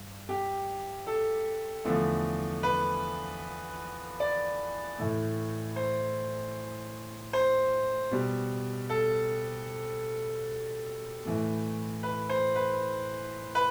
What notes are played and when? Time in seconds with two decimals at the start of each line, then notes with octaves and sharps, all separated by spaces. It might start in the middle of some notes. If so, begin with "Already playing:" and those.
Already playing: G2
0.29 G4
1.07 A4
1.85 E2 D3 F3 A3
2.63 B4
4.20 D5
4.98 A2 E3 A3
5.76 C5
7.33 C5
8.11 B2 G3
8.90 A4
11.25 A2 E3 A3
12.03 B4
12.29 C5
12.56 B4
13.55 B4